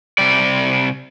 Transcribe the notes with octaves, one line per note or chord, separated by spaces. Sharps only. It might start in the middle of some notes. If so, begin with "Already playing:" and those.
C3 G3 D5